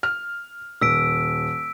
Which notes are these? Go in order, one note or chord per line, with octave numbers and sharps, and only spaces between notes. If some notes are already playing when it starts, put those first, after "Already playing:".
F6
D#1 E6 B6 D7